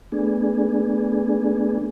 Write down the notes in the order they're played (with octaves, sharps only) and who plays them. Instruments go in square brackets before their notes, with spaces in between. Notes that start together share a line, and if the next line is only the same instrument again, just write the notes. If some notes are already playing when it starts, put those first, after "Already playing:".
[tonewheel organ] A3 B3 D4 G#4